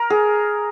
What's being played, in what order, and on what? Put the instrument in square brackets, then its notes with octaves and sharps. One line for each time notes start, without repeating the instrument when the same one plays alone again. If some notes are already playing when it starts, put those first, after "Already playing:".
Already playing: [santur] A#4
G#4